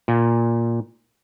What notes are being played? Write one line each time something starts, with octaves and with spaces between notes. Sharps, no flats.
A#2